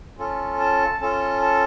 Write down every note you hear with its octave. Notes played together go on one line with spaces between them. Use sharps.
C#4 F4 A4
A5
C#4 F4 A4 A5
A5